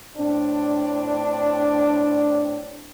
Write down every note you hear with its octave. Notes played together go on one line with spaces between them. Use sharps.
A2 C4 D4